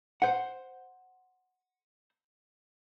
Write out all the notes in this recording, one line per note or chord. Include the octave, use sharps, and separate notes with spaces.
C5 F#5